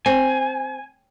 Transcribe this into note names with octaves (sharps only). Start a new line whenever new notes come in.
C4 G#5